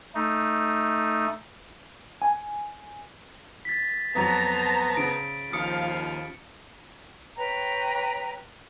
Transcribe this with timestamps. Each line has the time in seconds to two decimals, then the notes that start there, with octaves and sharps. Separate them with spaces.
0.15 A3 D#4
2.22 G#5
3.65 A6 B6
4.15 F2 F#3 B3 C5 A5 A#5
4.97 C#3 D7
5.53 D#2 F3 F5 D#6 C#7
7.37 B4 C#5 G5 A#5